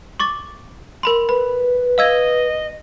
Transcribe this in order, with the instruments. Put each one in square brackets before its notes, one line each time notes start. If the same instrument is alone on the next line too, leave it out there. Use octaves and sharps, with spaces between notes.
[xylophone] C#6 D6 A6
A#4 B5 C6
[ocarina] B4 [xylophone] B5
[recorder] D#5 [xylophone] F5 E6 G#6